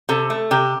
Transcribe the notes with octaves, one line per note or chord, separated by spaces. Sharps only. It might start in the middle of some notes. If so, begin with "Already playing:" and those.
C3 A4
A3
C3 G4